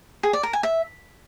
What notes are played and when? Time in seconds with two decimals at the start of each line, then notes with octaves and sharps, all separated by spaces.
0.23 G#4
0.33 D5
0.43 A#4
0.53 G#5
0.63 E5